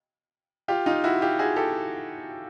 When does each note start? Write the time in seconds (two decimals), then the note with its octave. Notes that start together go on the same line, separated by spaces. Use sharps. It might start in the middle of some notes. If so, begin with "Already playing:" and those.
0.68 F4 G4
0.86 D#4 F4
1.04 E4 F#4
1.22 F4 G4
1.39 F#4 G#4
1.56 G4 A4